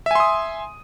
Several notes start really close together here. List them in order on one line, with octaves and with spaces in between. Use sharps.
E5 G#5 C6 D#6